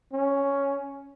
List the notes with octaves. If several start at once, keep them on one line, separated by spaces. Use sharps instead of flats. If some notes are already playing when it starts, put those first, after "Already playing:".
C#4